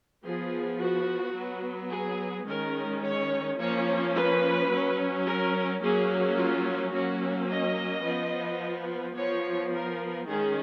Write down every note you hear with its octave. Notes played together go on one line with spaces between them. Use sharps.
F3 B3 G#4
F#4
F#3 B3
G#4
D#3 G#3 C#4 A#4
C#5
F3 A#3 C#4 C#5
B4
F#3 C#4
A#4
F#3 A#3 C#4 G#4
F4
F#3 A#3 C#4 F#4
D#5
F3 B3
F3 B3 C#5
A#4
D#3 G#3 C#4 G#4